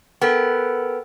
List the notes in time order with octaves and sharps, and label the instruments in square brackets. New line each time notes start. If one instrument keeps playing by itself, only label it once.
[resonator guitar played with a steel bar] B3 [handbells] A4 A#4 G5